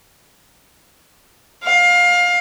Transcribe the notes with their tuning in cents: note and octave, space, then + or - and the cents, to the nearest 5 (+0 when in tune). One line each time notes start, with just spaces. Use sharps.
F5 +20